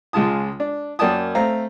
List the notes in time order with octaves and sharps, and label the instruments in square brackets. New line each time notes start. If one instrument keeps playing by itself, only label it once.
[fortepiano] C#2 G#3 F4 A5 D#6
D4
F#2 A#3 D5 G5 A5 D#6
A3 C4 F5 A#5